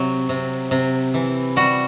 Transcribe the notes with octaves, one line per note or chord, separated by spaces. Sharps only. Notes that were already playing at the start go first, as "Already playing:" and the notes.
Already playing: C3 F#3
C3
C3
E3
G3 F#4